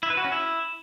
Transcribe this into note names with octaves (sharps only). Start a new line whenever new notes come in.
E4
B4
F#4
C#4
E4